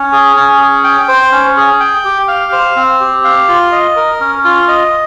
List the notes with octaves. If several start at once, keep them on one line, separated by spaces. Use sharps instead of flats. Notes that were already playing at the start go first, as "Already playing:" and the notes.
Already playing: C#4
G#4
C#4
G#4
G5
C5
C#4
G#4
G5
G4
F5
C5
C4
G4
F5
F4
D#5
A#4
C#4
F4
D#5